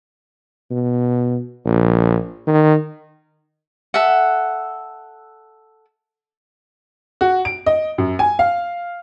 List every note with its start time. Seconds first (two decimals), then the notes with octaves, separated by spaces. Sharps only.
0.71 B2
1.66 A#1
2.47 D#3
3.94 A4 E5 F#5
7.21 F#4
7.45 D7
7.66 D#5
7.98 F#2
8.19 G#5
8.39 F5